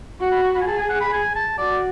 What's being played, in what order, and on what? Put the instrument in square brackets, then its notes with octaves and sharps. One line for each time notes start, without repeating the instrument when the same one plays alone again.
[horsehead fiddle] F#4 [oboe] C#6
[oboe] B5
C#6
B5
G#5
[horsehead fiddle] G#4 [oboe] A5
[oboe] G#5
F#5
B5
G#5
A5
[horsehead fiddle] F#4 [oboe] D5